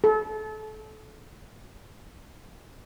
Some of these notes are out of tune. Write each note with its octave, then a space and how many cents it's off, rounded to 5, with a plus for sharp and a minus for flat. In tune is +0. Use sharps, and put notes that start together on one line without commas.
A4 -30